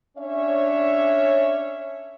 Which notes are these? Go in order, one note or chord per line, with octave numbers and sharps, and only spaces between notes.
C#4 D4 C#5 E5